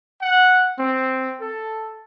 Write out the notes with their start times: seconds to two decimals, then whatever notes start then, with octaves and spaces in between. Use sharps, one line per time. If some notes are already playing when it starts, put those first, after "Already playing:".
0.22 F#5
0.79 C4
1.41 A4